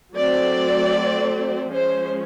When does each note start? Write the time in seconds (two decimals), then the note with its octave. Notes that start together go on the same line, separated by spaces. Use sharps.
0.14 F#3 A3 C4 D5
1.72 F3 G#3 C#4 C5